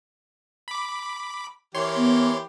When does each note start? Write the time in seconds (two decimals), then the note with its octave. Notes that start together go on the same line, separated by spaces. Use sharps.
0.68 B5 D6
1.75 E3 A#3 G4 C#5 C6
1.96 B3